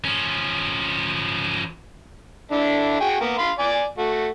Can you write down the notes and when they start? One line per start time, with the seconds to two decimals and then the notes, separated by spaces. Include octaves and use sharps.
0.05 F3 C#4
2.51 D3 D4 E4
3.00 F#4 G#4 G5
3.21 A#3 B3
3.38 F5 B5 C6
3.59 D5 G#5 D6
3.98 A3 F#4